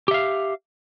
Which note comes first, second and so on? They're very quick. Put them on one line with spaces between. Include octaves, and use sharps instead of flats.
G4 E5 F5